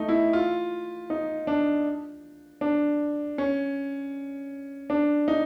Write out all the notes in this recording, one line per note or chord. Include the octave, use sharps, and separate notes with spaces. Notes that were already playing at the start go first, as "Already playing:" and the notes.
Already playing: A3 D#4
E4
F4
D#4
D4
D4
C#4
D4
D#4